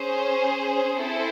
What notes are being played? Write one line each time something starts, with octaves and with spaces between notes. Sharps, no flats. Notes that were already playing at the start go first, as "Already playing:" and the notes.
Already playing: C#4 G#4 C5
C4 E4 A4 C5